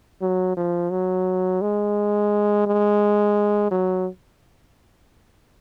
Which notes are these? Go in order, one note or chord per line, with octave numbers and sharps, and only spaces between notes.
F#3
F3
F#3
G#3
G#3
F#3